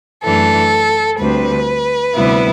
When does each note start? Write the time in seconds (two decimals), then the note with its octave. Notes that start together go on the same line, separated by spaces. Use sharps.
0.23 F#2 E3 A3 D4 A4
1.19 D2 D3 G3 C4 B4
2.15 D2 C3 G3 B3 E4